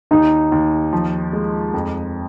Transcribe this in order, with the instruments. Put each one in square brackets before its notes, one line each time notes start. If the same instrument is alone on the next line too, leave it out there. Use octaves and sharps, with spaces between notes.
[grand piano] D#2 [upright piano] D#4
[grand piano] D#2
F3
G#3
F2